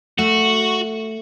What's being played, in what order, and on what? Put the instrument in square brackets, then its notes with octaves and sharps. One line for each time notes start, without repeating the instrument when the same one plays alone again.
[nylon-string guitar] A3 [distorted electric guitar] F#4